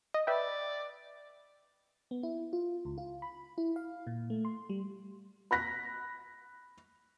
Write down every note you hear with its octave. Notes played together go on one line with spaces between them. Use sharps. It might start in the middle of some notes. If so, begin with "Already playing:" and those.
D#5
B4 D5 E5 G5
B3
E4
F4
C#2
F4
B5
E4
F5
A#2
A3
C6
G3
B5 F#6 A#6 B6